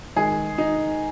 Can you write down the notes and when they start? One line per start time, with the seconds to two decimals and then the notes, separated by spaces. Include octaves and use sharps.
0.16 D#3 G#3 G#4
0.58 D#4